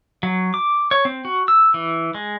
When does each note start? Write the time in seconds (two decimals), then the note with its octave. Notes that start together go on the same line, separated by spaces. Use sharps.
0.23 F#3
0.54 D6
0.91 C#5
1.05 C4
1.25 F#4
1.48 E6
1.74 E3
2.14 G#3